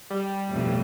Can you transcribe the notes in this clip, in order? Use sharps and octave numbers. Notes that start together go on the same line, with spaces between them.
G3
B1 F2 A2